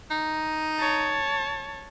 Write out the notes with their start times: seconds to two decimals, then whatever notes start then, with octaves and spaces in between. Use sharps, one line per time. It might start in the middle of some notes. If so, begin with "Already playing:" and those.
0.11 D#4
0.79 C#5 A5